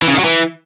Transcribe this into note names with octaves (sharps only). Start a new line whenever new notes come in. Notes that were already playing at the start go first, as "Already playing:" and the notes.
E3
C#3
D#3
F#3
E3